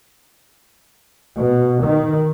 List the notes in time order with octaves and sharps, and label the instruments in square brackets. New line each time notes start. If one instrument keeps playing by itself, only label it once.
[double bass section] B2
D#3